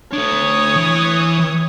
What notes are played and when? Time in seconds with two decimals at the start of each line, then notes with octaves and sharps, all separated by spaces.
0.13 A3 D4 C#5 D#6
0.76 E3